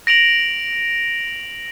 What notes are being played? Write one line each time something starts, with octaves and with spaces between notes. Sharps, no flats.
A#6 D7 F7 F#7